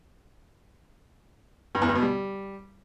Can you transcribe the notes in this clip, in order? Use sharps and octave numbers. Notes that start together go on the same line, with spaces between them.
G2
E2
G2
B2
G3